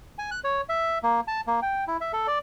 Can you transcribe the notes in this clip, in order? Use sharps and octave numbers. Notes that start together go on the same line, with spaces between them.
G#5
F#6
C#5
E5
A#3
A5
A#3
G5
E4
E5
A4
D5